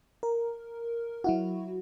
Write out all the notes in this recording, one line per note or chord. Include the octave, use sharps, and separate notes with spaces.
A#4
F#3 E4 F#4